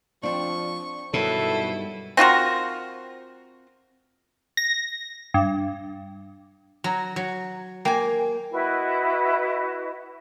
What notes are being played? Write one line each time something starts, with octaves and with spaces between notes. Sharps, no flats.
F3 C4 D4 C#6
G2 B2 D#3 F#3 E4 A4
C4 F4 F#4 A#4
A#6
G2
F#3 A#5
F#3
A#3 G5 G#5
E4 F#4 B4 D#5